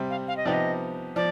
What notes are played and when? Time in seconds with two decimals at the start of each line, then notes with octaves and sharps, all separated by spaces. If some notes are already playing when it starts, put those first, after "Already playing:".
Already playing: C3 G3 C4
0.11 F5
0.28 F5
0.37 D#5
0.45 C3 F3 B3 D#4 G4 D5
0.53 D#5
1.16 F3 D5